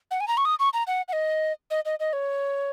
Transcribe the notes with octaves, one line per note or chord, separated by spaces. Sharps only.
F#5
G#5
A#5
C#6
D#6
C#6
A#5
F#5
F#5
D#5
D#5
D#5
D#5
C#5